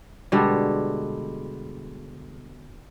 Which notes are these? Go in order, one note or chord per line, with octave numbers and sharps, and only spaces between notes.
B2 D3 G3 G#3